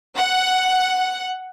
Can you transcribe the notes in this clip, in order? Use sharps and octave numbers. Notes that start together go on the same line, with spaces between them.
F#5